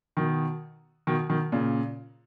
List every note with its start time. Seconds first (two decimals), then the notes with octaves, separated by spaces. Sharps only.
0.17 B2 D#3
1.07 B2 D#3
1.29 B2 D#3
1.52 A#2 C#3